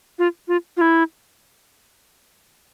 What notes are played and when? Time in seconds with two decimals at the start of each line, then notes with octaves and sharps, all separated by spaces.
0.19 F4
0.48 F4
0.77 F4
0.81 E4